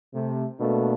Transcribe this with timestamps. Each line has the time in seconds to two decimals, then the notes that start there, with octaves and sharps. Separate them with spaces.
0.14 C3 A3
0.60 B2 A3 A#3 D4